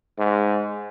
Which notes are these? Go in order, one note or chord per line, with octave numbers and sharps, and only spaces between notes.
G#2